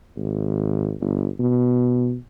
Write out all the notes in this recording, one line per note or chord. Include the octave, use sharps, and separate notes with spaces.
G#1
G1
B2